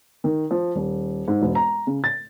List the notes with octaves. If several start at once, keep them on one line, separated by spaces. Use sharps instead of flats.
D#3
F3
D#1
G#2
E1
A#5
C#3
A6